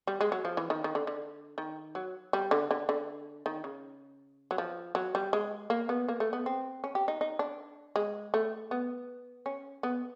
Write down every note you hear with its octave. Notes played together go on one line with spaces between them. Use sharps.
G3
G#3
F#3
F3
E3
D#3
D#3
D3
D3
D#3
F#3
G3
D3
D3
D3
D#3
C#3
F#3
F3
F#3
G3
G#3
A#3
B3
A#3
A3
B3
C4
C#4
G4
D#4
D#4
D4
G#3
A3
B3
C#4
B3